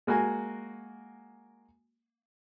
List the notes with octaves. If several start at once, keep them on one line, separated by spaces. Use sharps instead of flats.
G#3 A#3 F#4 G#5